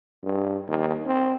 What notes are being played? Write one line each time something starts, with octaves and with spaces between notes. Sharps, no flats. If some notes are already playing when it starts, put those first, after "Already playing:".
G2
D#2
C4